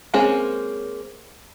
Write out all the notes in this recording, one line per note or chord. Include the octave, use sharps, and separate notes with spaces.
G#3 A#3 C4 C#4 G#4